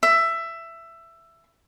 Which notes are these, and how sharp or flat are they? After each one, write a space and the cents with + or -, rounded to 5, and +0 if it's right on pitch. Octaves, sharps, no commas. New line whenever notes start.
E5 +15